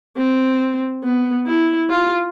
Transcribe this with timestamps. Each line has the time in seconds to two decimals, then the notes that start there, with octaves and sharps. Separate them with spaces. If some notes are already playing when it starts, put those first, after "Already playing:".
0.17 C4
1.04 B3
1.46 E4
1.90 F4